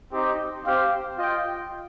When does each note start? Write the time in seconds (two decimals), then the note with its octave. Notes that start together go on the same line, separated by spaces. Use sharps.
0.13 C4 D#4 G4
0.65 C4 G4 C5 F5
1.18 F4 D#5 G5